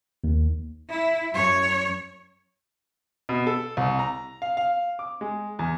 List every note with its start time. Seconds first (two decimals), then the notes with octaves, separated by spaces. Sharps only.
0.24 D#2
0.89 E4 E5
1.33 F#2 C#5
3.29 B2
3.47 A4
3.77 C2
3.99 A#5
4.42 F5
4.57 F5
4.99 D6
5.21 G#3
5.59 E2